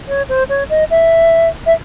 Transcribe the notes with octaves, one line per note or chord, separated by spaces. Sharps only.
C#5
C5
C#5
D#5
E5
E5